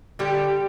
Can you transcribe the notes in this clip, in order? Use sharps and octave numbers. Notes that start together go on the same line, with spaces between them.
D3 G3 G4